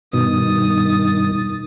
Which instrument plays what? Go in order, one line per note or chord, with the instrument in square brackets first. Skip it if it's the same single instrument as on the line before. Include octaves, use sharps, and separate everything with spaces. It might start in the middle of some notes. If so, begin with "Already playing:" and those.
[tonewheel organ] G2 D#3 [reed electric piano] B2 [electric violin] D#6 A6